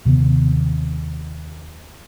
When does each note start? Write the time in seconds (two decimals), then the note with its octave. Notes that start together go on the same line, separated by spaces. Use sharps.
0.05 D#2 C3 D#3 B3